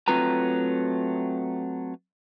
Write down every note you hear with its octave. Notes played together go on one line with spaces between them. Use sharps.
F#3 A3 C4 F4 B4 A#5